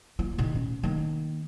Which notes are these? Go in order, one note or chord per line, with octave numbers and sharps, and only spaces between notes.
A#3 F4
A#2 D#3
C#4
D#3 A#3